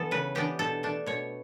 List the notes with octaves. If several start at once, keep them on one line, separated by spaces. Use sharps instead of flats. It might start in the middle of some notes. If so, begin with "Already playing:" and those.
Already playing: E3 B3 A4
C#3 B4
E3 B3 D4 G4
B2 A4
A3 D4
B2 C#5